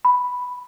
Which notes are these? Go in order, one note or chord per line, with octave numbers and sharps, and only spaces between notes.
B5